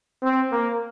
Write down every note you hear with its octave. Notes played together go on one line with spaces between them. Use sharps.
C4
A#3